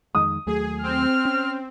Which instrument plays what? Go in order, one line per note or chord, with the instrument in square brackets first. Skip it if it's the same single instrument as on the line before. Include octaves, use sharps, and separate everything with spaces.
[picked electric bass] F2 D#3 G#3 [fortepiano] D#6
[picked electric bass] D#2 F#3 A3 [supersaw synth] G#4
[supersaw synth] C4 [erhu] F6
[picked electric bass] C#4